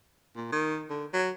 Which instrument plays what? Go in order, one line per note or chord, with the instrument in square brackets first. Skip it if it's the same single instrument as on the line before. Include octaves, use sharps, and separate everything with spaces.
[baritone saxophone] A#2
D#3
D3
F#3